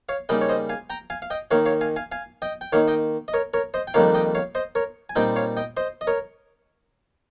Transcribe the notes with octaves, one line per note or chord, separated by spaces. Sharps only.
C#5 F5
C#3 G3 A#3 D#4 D#5 G5
C#5
C5 D#5
F5 G#5
G5 A#5
F5 G#5
F5
D#5 G5
D#3 A#3 D#4 C#5 F5
C#5 F5
F5 G#5
F5 G#5
F5 G#5
D#5 G5
G5
D#3 A#3 D#4 C#5 F5
D#5 G5
D#5
A#4 C#5
A#4 C#5
C5 D#5
G5
F2 D#3 G3 A#3 D#4 C#5 F5
D#5 G5
C#5 F5
C5 D#5
A#4 C#5
G#5
A#2 G3 C4 D#4 D#5 G5
C#5 F5
D#5 G5
C5 D#5
D#5
A#4 C#5